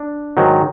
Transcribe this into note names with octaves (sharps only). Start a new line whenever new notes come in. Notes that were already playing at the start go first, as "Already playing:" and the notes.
Already playing: D4
G#2 D#3 F#3